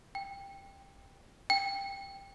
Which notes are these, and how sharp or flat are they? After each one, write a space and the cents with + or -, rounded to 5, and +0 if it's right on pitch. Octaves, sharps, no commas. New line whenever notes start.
G5 +15
G5 +15